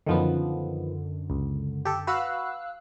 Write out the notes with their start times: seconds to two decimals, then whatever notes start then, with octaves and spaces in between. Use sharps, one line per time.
0.07 F#2 D3 D#3 F3 B3
1.30 C#2
1.85 G4 A4
2.07 F#4 B4 F5 E6 F#6